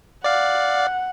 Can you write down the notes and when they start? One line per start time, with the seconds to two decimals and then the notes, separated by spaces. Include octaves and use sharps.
0.24 D5 F5 F#5